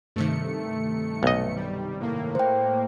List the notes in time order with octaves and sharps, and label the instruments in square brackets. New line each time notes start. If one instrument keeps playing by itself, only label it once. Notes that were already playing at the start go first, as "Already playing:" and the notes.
[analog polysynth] G2 C3 D#3 [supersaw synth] A3 C#7
[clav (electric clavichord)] B1 D#5
[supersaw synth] G3
A2 A#3
[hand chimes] C5 G5